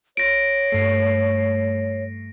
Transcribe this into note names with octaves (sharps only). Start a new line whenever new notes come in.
C#5 A#6 D7
G2 A3 C7